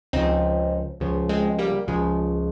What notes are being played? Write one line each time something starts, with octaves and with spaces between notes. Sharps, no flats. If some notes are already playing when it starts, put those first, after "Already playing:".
C#2 C#3 F3 C4 D#4
C#2 C#3 F3
G#3 C4
G3 A#3
C#2 C#3 F3 G#3